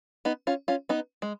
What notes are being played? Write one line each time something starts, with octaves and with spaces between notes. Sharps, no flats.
B3 D#4
C#4 F4
C#4 F4
B3 D#4
G#3